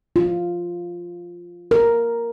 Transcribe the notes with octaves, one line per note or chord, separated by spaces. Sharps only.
F4
A#4